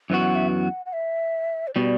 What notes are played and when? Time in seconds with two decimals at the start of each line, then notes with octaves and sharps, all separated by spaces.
0.10 F#2 E3 B3 F#4
0.22 F#5
0.35 E5
0.48 F#5
0.86 F#5
0.93 E5
1.67 C5
1.75 B2 G3 D5